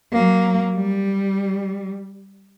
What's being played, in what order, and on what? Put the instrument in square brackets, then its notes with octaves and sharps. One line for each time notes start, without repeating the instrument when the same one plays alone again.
[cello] F#3 A#3
G3